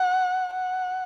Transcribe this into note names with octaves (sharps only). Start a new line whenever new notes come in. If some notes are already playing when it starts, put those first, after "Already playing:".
Already playing: F#5
F#5